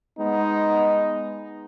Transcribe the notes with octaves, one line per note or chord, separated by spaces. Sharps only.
G#3 B3 D#4